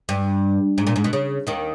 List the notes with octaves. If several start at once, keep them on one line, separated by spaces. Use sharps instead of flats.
G2
G#2
A#2
G#2
B2
C#3
D#2 D#3